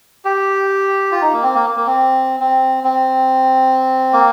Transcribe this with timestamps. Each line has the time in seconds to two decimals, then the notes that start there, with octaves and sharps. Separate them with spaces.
0.25 G4
1.12 F4
1.22 D#4
1.33 A#3
1.43 C4
1.54 A#3
1.76 A#3
1.87 C4
2.40 C4
2.84 C4
4.13 A#3